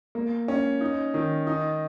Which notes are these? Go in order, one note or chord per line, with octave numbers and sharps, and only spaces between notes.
A#3
C#4
D#4
D#3
D#4